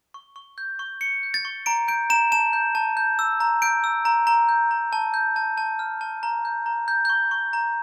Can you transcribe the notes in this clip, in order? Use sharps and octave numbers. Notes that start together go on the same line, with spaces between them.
C#6
C#6
G6
C#6
C#6 C#7
G6
A6
C#6
A#5 D7
G6 D7
A#5 E7
A5 E7
G6
A5
G6
E6
A#5
G6 D7
E6
A#5
A#5
G6
A#5
A5
G6
A5
A5
F6
A5
A#5
G6
A#5
G6
C#6 G6
C#6
A#5